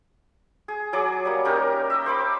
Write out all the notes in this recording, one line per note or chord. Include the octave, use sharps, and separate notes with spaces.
G#4
F#3 G#4 D5 D6
G3 A#3
C#4 D#4 G4 A#4
D#5 E5
C5 B5 D6